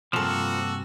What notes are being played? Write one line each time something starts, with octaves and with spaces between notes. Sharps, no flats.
G2 C3 F3 A#3 F#4 A4